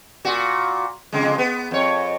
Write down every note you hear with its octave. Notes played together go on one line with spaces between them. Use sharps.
A#2 F#4
F2 C#3 G#3
B3
F2 C#5